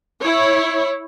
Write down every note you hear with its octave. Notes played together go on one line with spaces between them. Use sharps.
E4 C#5